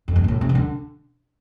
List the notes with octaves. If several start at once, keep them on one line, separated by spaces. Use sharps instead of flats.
F2
G2
B2
A2
C3
E3
D3